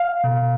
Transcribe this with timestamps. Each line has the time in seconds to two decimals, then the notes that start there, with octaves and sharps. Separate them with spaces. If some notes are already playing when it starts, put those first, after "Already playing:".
Already playing: F5
0.24 B2